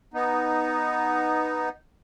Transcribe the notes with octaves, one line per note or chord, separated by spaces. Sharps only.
B3 D#4